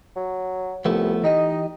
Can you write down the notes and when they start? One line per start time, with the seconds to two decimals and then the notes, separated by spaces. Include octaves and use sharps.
0.16 F#3
0.85 C2 F3 A3 B3
1.24 E3 D#4 G4 D#5